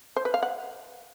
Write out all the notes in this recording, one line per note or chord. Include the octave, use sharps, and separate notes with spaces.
C5
B4
F5
F#5